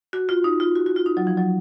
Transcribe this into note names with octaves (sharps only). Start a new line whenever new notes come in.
F#4
F4
D#4
F4
F#4
F#4
F4
D#4
F#3
F3
F#3